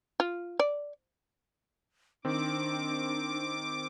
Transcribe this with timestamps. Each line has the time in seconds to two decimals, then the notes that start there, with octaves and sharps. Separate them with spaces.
0.20 F4
0.59 D5
2.25 D#3 C4 D4 D6